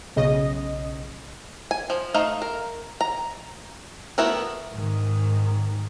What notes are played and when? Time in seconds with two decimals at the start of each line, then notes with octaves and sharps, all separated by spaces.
0.16 B1 C#3 D#5
1.71 G#5
1.90 F3
2.14 A3 D#4 F5
2.42 A#4
3.01 A#5
4.18 A3 B3 E4 F#4 A#4
4.73 G#2 D#3